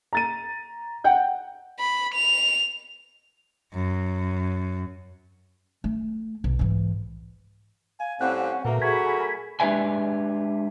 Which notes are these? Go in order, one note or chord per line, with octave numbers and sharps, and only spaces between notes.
A#5 A6 D#7
F#5 G5 G6
B5
F7
F#2
A3
B1
G#2 E3
F5 G#5
A2 G3 C4 C#4 F#5
A#2 F#3 A3 A#3 A#4 B4 E5
F#4 G#4 A4 F#5 G#5 B5
G#3 D4 G4 B4 E5 G#5